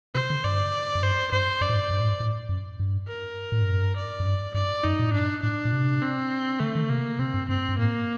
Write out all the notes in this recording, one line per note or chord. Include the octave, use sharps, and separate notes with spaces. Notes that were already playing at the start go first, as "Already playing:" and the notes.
C3 C5
D3
G2 D5
F#2
G2 C5
G2 C5
F#2 D5
A2
G2
G2
A2
G2
A2
F#2
G2
A#4
A2
G2
F#2
G2
D5
F#2
G2
G2 D5
F#2 D#4
A#2
A2
G2 D4
A2 D4
A#2
C3
C4
D3 A3
D#3
D3
C3 A#3
C3 C4
G2
G2 C4
G2
A2 A#3